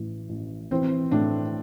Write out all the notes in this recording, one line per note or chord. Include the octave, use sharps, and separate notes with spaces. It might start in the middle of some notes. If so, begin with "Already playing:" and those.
Already playing: A1 A2 E3
A1
E3 C4
A2 D4